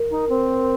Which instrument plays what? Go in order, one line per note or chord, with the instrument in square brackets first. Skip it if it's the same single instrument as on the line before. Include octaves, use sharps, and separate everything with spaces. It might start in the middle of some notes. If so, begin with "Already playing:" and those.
Already playing: [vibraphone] A#4
[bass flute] D#4
C4